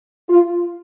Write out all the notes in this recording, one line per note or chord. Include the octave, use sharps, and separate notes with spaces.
F4